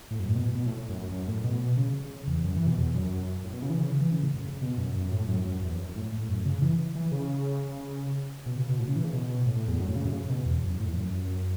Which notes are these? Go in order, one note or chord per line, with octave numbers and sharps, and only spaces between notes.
A2
F#2
A2
B2
B2
A2
A2
F#2
F#2
F#2
A2
B2
C#3
C#3
C#3
E2
F#2
E3
B2
E2
F#2
A2
B2
C#3
E3
C#3
E3
C#3
A2
F#2
C#3
B2
F#2
F#2
A2
F#2
F#2
E2
F#2
A2
A2
F#2
C#3
E3
E3
C#3
B2
C#3
B2
A2
C#3
E3
C#3
B2
A2
A2
E2
F#2
A2
C#3
F#2
C#3
C#3
B2
E2
F#2
A2
E2
F#2